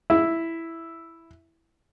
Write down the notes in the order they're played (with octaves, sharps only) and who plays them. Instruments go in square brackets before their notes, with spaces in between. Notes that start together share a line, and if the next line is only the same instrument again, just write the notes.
[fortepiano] E4 E5